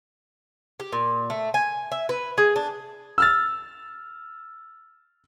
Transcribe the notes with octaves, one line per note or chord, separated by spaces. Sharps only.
G4
A#2
A3
G#5
E5
B4
G#4
D4
E6 F6 A6